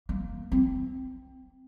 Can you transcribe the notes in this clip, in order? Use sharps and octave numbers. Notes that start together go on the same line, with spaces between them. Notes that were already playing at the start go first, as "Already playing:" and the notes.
A#3
C4